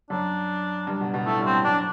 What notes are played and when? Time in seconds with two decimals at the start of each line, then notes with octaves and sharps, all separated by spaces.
0.10 F#2 D4
0.87 G2
1.01 B2
1.14 B2
1.26 A2 A3
1.39 G2
1.45 C4
1.52 A2
1.65 F#2 D4